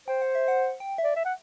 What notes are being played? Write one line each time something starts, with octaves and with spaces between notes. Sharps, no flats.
C5 G5
F#5
E5
F#5
G5
E5
D5
E5
F#5